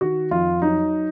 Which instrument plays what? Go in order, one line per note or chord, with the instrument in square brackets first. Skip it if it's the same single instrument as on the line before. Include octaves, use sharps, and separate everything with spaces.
[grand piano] D#3 F#4
F2 F4
F#3 D#4